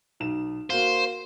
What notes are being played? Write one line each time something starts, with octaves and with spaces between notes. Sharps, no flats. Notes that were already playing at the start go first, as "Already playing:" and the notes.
B1 E7
A#3 F#4 C5 F5